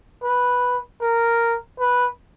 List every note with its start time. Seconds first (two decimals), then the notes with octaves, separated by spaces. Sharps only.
0.23 B4
1.01 A#4
1.79 B4